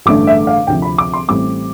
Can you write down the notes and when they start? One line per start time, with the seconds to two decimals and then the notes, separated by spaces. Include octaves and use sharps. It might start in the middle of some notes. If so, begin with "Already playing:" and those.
0.06 A1 G2 D3 A3 D6
0.27 E5
0.47 F5
0.67 D2 C3 F3 G5
0.82 B5
0.98 D6
1.14 C6
1.28 A1 A2 G3 C4 D6